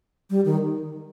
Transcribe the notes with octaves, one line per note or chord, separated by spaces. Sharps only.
G3
D#3